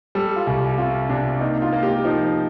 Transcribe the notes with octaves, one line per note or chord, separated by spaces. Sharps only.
G3 A4
F4
C2
G4
C3 F4
C3 D4
A#3 D#4
F4
A#3
G4
F3 D#4